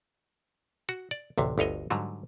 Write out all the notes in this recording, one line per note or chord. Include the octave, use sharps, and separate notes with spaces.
F#4
D5
A1 D2 C3
G1 D2 C#5 D#5
G#2 D3 F#3 G3